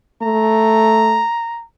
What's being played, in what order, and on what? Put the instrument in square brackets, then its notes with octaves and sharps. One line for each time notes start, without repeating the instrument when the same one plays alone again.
[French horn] A3 [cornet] A#5